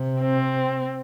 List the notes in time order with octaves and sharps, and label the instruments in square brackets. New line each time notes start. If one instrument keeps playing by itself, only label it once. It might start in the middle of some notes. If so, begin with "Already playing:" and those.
Already playing: [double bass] C3
[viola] C4